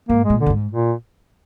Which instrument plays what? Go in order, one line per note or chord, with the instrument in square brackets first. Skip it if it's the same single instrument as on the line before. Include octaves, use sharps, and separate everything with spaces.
[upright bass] G#2 [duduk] A#3
[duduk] G#3
[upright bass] A#2
[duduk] D3
[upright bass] A#2
G#2
[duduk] A#2